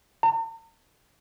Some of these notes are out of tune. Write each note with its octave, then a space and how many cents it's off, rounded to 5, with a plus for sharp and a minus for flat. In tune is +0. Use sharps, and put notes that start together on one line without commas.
A#5 -45